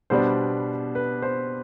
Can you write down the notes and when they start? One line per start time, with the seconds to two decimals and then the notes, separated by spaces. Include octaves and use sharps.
0.10 B2 G3 B3 D4 C5
0.95 B4
1.22 C5